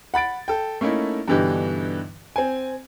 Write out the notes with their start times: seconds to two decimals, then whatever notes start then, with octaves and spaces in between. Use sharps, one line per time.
0.14 F#5 B5 A6 D7
0.48 A4 G5
0.81 A3 A#3 C#4 D#4 E4
1.28 G2 B2 D3 E3 D#4 G4
2.36 C4 G#5